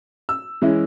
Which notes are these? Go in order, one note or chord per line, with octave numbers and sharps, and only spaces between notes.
E6
E3 G#3 C#4 E4